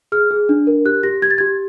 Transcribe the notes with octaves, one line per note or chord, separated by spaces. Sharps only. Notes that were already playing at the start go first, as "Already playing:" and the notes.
G#4 F6
G#4
D4
A#4
G4 F#6
G4 A#6
G4 G#6
A6
G4 G#6